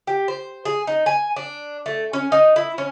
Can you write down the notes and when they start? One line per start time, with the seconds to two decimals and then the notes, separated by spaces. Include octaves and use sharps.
0.07 G4
0.28 C5
0.65 G#4
0.87 D#4
1.06 G#5
1.36 D4
1.86 A3
2.13 C#4
2.32 D#4
2.56 E4
2.78 C#4